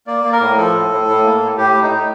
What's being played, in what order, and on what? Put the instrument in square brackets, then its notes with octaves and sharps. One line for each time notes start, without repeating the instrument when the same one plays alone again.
[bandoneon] A#3 D5
A#3
A#4
A2
F3 A4
A2
A2
A2
A#3
A2
A2 G4
A2
D#4
A2